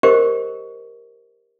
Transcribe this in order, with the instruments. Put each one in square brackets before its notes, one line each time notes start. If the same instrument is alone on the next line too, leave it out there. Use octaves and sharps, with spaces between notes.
[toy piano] G4 A#4 C5 D#5 C#6